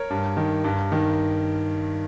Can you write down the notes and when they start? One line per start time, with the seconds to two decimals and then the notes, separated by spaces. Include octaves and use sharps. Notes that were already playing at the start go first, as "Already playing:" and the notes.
Already playing: A#4 C#5
0.10 G2
0.37 D#3
0.64 G2
0.92 D#3